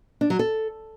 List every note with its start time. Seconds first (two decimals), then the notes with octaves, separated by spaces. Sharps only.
0.21 D4
0.30 F#3
0.39 A4